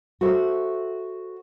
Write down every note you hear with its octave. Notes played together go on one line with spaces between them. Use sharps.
F#4 A4 C5 E5